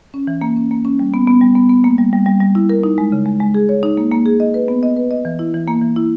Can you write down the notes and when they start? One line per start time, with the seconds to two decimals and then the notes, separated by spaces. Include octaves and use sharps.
0.14 C#4
0.27 E3
0.41 A#3
0.56 C#4
0.71 A#3
0.85 C#4
0.99 G3
1.14 B3
1.28 B3
1.41 G3
1.55 B3
1.69 B3
1.84 A#3
1.98 G3
2.13 G3
2.26 G3
2.40 G3
2.55 E4
2.70 A#4
2.84 D#4
2.98 G#3
3.12 C#3
3.26 G#3
3.40 G#3
3.54 G#4
3.69 C#5
3.83 D#4
3.97 A#3
4.11 A#3
4.26 G#4
4.40 D#5
4.54 B4
4.68 B3
4.83 D#5
4.96 B4
5.11 D#5
5.25 E3
5.39 E4
5.54 E3
5.68 A#3
5.82 E3
5.96 E4